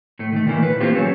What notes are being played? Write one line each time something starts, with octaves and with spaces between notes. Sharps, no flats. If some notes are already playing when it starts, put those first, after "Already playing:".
A2 A3
D#3 A3
A#2 D#3 E3 A#3 E4
B4
A3 A#3 C4 F4 G4 B4
F#3 C#4 G4 A4